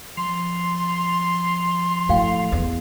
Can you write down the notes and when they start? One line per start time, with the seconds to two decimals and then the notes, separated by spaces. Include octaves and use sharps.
0.17 F3 C6
2.09 A2 F#4 F5 G5
2.52 E2